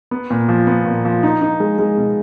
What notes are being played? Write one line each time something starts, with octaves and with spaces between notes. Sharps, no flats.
B3
A#2
F3
B3
A#2
F3
D#4
D#4
G#3
G#3
B2